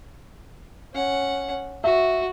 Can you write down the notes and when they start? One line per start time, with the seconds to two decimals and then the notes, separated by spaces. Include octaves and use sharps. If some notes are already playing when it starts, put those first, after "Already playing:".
0.94 C#4 F#5
1.84 F#4 E5